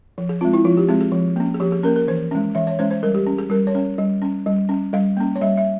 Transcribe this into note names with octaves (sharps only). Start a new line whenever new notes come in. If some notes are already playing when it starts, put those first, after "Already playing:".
F3
G#4
G#3 C4 F4
E4
F3 F4
G4
G#3 C4 G#4
G#4
F3
A#3 C#4
G#4
F3 G4
G#4
A#3 C#4 A#4
A#4
E3 C5
G#3 C#4
E3 E5
C#5
G#3 C#4 C5
C5
G3 A#4
G4
C#4
G#4
G3 A#4
C#5
C#4
G3
C#4
G3
C#4
G3 F5
A#3 C#4
C#5
G3 E5
E5